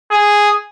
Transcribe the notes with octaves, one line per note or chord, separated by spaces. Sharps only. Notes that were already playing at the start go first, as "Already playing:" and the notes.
G#4